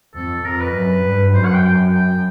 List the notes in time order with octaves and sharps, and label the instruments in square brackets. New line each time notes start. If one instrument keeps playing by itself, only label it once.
[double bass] F2 [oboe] A4
[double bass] F2 [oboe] A#4
[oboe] B4
[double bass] F#2
G2
[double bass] F#2 [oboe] C5
[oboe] F#5
G5
G5
G5